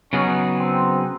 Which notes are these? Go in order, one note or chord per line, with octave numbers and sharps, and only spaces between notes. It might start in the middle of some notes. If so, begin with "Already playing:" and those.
C#3 F#3 B3 C#4 D#4 G#4
C4